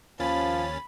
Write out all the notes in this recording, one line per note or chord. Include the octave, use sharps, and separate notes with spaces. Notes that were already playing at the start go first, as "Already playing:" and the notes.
D#2 F3 C#4 B5 A6